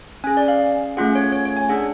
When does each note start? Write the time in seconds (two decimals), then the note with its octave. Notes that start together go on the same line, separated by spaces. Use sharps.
0.24 C#4 G#4 G#5
0.37 D5
0.48 F5
0.97 A3 C#4 F4 G#4 F#5
1.15 C#5
1.32 C#5
1.45 C#5
1.57 G#5
1.69 D4 G#4 F#5